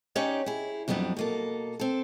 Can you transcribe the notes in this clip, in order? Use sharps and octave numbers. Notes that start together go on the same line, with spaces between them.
C#4 D#4 G4 C#5 D5
E4 G#4
F2 F#3 G3 B3 D4
B2 A#3 A4
C4 A4